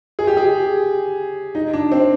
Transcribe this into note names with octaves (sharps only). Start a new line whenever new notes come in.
G#4
G4
G#4
D#4
D4
C4